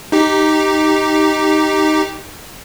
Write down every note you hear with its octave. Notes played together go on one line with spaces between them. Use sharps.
D#4 G4